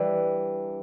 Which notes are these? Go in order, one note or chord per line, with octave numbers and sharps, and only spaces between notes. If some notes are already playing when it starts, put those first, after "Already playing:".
Already playing: E3 G3 D4